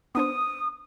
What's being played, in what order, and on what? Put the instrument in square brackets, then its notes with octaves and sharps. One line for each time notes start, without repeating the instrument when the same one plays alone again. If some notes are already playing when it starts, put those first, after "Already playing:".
[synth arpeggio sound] B3 D4 C5 [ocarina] D#6